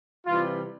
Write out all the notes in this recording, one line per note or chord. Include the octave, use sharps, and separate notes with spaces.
C3 E3 G3 F4